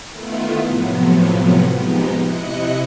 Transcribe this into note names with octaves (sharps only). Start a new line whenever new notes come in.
D#3 A3 B3 E4 F4
A2 C3 F3 F#3 B3
F3 G#3 B3 D#4 G4
C3 E4 D#5 F#6 C#7